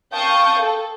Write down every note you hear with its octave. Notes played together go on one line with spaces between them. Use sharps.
F5 G5 A5 C#6 D#6 G6
A4